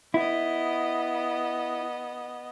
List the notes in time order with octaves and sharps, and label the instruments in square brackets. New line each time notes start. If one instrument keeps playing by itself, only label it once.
[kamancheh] B3 D#5 [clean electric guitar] E4